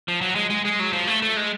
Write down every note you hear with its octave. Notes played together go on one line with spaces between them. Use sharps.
F3
F#3
G#3
G#3
G#3
F#3
F3
A3
A3
G#3